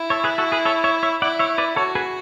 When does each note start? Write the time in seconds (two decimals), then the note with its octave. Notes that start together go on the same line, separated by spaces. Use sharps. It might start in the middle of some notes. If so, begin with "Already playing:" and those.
Already playing: E4
0.10 A4 C#5
0.24 G#4 B4
0.38 F#4 A4
0.52 G#4 B4
0.65 A4 C#5
0.84 C#5 E5
1.03 C#5 E5
1.22 E4 D5 F#5
1.39 C#5 E5
1.58 B4 D5
1.76 F#4 A4 C#5
1.95 G#4 B4